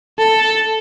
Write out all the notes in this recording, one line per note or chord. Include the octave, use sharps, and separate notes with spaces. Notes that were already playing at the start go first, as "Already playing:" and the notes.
A4